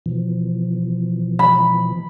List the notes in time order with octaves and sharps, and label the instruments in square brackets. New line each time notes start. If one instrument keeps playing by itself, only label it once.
[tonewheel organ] B2 E3 F3
[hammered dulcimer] B5